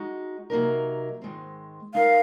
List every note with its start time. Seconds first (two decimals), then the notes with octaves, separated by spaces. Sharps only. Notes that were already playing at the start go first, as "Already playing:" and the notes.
Already playing: G#3 D#4 F#4
0.50 C3 F#3 A#3 D#4 A#4
1.22 G#2 D#3 G#3 C4
1.94 G#3 D#4 A#4 D#5 F5